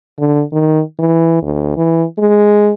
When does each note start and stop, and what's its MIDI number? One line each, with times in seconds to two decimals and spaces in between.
0.19 0.43 50
0.53 0.81 51
1.00 1.41 52
1.43 1.73 38
1.77 2.04 52
2.19 2.72 56